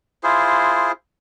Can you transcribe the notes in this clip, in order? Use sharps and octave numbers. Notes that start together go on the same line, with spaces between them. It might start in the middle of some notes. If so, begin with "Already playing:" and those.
E4 F4 G#4 C5